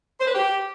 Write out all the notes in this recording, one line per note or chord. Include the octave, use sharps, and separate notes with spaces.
C5
B4
G4